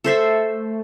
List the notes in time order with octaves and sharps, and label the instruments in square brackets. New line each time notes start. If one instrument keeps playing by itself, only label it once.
[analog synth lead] A3 [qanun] A4 C5 E5